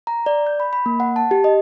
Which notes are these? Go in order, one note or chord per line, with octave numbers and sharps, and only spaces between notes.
A#5
D5
G6
B5
B5
A#3
F#5
A5
G4
D#5